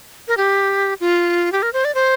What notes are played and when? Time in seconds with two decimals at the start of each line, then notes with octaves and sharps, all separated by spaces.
0.28 A#4
0.37 G4
1.00 F4
1.52 G4
1.62 A#4
1.73 C5
1.85 D5
1.95 C5